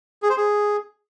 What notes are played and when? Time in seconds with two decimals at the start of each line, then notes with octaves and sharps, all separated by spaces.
0.23 G#4
0.30 C5
0.37 G#4